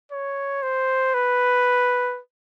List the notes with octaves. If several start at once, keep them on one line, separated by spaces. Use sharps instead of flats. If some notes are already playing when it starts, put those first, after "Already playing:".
C#5
C5
B4